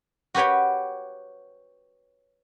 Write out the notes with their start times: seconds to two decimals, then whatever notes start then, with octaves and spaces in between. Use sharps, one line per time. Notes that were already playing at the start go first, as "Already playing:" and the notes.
0.34 F#4 G4 B4 C#5 G5